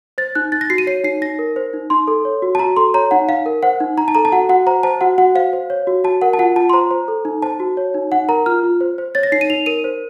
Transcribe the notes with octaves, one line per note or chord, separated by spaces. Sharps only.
C5 A6
D#4 F#6
D#4 A6
A#6
F#4 C7
D#7
C#5 C7
D#4 C7
D#4 A#6
A#4
C5
D#4
D#4 C6
A4
C#5
F#4
A5
F#4 A#5
A4 C6
C#5 A#5
D#4 F#5
D#4 F5
A#4
C5 F#5
D#4
D#4 A#5
A5
A4 A#5
A5
F#4 F#5
F#4 F#5
C5 A#5
C5 A5
F#4 F#5
F#4 F#5
C5 F5
C5
C#5
F#4
F#4 A5
A#4 F#5
A5
F4 F#5
F4 A5
C6
C5 A#5
C5
A4
D#4
C5 A5
F#4
C#5
D#4
D#4 F#5
A#4 A#5
F4 F6
F4
C5
C5
C#5 A6
A#6
D#4 C7
D#7
D#4 F7
A#4 D#7
C5